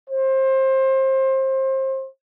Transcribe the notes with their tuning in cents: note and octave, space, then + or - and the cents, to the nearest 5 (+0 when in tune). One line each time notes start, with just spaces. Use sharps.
C5 +25